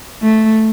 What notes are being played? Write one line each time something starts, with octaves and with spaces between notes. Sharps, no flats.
A3